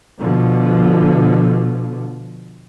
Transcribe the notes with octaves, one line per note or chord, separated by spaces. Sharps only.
B2 D3 F3